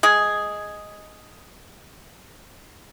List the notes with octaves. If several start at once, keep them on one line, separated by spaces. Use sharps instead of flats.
G#3 G#4